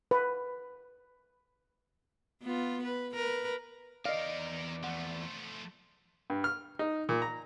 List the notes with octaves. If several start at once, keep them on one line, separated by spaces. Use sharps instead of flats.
B4
B3 F4
B4
A#4 B4
E2 D#4 A#4 D5 D#5 F5
F3 A3 F#5
G2
F6
D#4
A#2
A#5